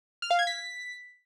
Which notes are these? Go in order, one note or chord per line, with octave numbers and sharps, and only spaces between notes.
F6
F5
G#6
B6